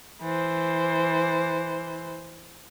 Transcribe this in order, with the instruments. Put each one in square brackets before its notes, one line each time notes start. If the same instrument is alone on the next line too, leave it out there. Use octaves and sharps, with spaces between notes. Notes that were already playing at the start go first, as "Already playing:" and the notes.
[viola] E3 C5